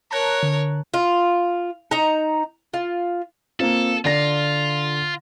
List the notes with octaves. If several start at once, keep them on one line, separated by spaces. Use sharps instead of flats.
A#4 C#5 A5 A#5 F#6
D3
F4
D#4 A#5
F4
A#3 C4 F4 A4
D3 F4 D5 A#6